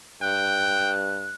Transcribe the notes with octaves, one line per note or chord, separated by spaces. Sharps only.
G2 G5 F#6